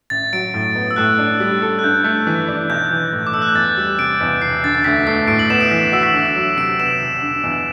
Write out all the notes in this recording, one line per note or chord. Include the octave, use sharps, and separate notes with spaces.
A1 A6
F#3 D7
A2
B3
E6
A2 F#6
D4
G3
A4
F#6
G2 G6
A3
E3
D4
B1 G6
E3
A2
D6
A3 E6
F#6
G6
E2 A6
G3
C3 D7
E2
E1 C7
D3 A6
A6
D2 B6
A3 C7
A2 D7
F#7
B3 E7
D7
E3 B6
F#4 E6
B6
D2
F#3
C3 D7
B3 E7
E1
D3
E2